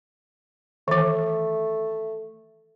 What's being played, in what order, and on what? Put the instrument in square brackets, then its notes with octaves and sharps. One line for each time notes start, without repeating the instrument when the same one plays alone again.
[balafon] D#3 E3 [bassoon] A3